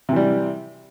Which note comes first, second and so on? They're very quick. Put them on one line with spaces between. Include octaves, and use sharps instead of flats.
C3 E3 G3